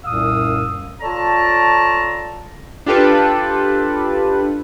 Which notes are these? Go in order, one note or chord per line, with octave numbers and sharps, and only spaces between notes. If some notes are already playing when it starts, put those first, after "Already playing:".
C2 F#2 A#2 F5 D#6 E6
F4 A4 C#5 D5 A5 A#5
D4 F4 G4 A4 B4